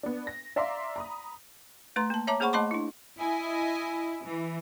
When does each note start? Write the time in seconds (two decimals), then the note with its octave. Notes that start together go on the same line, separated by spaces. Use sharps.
0.03 B3 D4
0.27 A#6
0.56 D5 E5 F5 A#5 C6 D6
0.96 A#5 B5 D#6
1.96 A3 B4 A#5 C6
2.10 A#3 A5
2.27 C#5 E5 A5 A#5 D6
2.40 A#3 G#4 C5 F#5 B5 C#6
2.53 A3 D#5 A5 B5 C6 D6
2.71 D4 E4
3.18 E4 D#5 G#5
4.25 E3